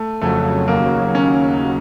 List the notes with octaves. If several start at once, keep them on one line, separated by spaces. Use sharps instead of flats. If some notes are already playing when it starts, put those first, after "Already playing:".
Already playing: A3
F2 C#3 F#3 A3
D#2 C#3 F#3 A#3
C#4